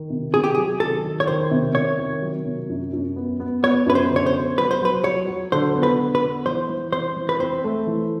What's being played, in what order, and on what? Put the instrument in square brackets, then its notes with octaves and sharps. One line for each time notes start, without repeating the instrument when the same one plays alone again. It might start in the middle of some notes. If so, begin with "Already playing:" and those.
Already playing: [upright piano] D#3
C3
[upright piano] C3 [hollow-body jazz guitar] G#4
[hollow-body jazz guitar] G4
[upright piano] F#3 [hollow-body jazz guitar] G#4
[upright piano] D#3 [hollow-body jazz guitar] A4
[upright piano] D#3
[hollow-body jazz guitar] C#5
[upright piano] D#3 [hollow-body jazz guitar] C5
[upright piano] C3
[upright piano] C3 [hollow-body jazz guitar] C#5
[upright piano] D#3
F#3
C3
F#2
F#2
B3
B3
[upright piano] B3 [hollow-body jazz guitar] C#5
[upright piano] F#2 [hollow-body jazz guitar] B4
[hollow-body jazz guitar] C5
[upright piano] D3
[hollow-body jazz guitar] C#5
C5
[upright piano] B3
[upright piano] F#3 [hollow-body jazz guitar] B4
[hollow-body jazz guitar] C5
[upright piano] F#3 [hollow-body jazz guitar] B4
[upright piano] F#3 [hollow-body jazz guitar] C#5
[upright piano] F#3
[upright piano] D3 [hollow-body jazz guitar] C5
[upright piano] B3
[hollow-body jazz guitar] B4
[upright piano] D3
[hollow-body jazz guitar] B4
[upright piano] B3
[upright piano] E3 [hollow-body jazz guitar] C5
[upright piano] E3
[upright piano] C4 [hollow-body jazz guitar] C5
[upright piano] E3
[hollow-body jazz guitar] B4
[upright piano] C4 [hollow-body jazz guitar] C5
[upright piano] A3
E3